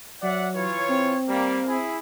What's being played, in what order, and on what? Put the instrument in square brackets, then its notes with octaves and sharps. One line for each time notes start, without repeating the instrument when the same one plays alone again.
[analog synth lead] F#3 [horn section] D5 E5 F#5
[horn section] E3 F4 C#5
[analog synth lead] C4
[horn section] G3 A#3
E4 G#4